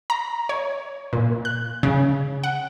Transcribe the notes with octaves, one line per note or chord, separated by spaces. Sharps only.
A#5
C#5
A#2
F#6
C#3
F#5